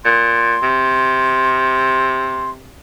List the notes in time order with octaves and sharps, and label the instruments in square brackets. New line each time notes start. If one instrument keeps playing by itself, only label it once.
[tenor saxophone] A#2 [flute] C6
[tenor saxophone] C3